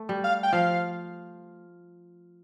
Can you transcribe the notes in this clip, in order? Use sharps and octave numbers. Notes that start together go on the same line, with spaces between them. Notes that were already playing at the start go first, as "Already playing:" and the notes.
Already playing: A3
G3
F5
G5
F3 F5